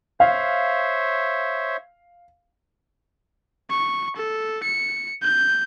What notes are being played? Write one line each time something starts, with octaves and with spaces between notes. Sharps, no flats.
C5 C#5 E5 F5
C#6
A4
C#7
G6